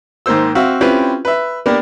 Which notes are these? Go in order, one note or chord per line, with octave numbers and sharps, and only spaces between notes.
G#2 D#3 A#3 C5 E6
C4 F#4 E5 F5
C4 C#4 E4 F4 G4 B4
B4 E5
A#3 B3 D4 G4 A#4